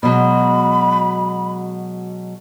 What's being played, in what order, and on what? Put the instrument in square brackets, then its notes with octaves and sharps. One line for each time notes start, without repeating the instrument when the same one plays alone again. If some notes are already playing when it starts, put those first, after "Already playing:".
[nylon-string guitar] B2 F#3 G#3 [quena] B5